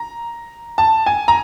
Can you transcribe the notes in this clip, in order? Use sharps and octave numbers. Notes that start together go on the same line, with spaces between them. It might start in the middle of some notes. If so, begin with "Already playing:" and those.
Already playing: A#5
A5
G#5
A#5